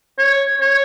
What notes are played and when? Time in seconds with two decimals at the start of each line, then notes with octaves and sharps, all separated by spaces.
0.18 C#5
0.60 C#5